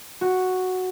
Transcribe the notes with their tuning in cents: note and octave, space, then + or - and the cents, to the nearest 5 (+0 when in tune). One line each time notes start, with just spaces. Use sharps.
F#4 +0